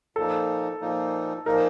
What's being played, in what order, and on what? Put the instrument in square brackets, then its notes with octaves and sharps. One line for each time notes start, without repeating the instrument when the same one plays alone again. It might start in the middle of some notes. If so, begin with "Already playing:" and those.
[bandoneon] A#2 F3 A#3 D#4 [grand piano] A4
[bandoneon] A#2 F3 A#3 D#4
[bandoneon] A#2 F3 A#3 D#4 [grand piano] A#4